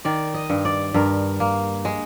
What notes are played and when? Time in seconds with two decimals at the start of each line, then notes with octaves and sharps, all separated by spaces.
0.05 D#3 D5
0.34 D#5
0.50 G2
0.65 D5
0.94 G2 A#4
1.40 A#3
1.85 G#3